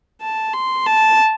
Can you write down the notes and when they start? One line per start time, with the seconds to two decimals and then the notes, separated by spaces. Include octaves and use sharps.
0.21 A5
0.53 C6
0.86 A5